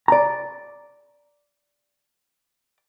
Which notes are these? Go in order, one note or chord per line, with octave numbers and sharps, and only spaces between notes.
D5 A#5